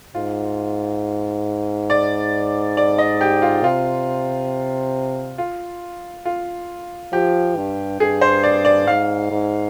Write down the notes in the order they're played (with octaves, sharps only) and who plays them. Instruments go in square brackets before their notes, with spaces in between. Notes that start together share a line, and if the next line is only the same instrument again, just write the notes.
[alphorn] G#2 [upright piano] F4
[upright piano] D5
D5
D#5
G4
F4
[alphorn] C3 [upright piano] F4
[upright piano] F4
F4
[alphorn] F3 [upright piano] G4
[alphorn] G2
[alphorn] G2 [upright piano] G#4
[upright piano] C5
D5
D5
[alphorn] G#2 [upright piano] F5
[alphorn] G#2